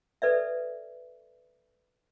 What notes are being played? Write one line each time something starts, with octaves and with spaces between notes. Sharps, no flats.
A4 B4 D5 E5